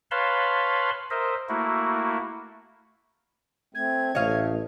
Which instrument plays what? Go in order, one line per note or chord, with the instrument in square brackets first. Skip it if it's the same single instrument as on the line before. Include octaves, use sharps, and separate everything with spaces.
[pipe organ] B4 C#5 F5 A5 B5 C6
A#4 C5 D#5 E5
A3 A#3 E4 F#4
[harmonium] A3 C4 [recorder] G#6
[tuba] A1 [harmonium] A3 [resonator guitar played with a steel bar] C#5 D#5 F5